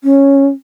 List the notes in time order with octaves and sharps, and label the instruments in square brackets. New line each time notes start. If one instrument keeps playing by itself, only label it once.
[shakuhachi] C#4